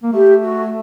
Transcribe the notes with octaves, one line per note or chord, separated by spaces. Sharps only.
A#3
A3 G4
F#4